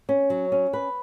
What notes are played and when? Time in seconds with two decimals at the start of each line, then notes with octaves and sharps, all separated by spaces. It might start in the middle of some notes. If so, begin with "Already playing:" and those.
0.09 C#4
0.30 F#3
0.52 C#4
0.73 B4